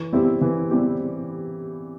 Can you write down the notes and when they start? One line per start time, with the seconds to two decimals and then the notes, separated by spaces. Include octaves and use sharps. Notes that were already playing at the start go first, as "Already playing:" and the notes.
Already playing: E3
0.12 G3 C4 E4 G4
0.41 E3
0.70 G3 C4 E4 G4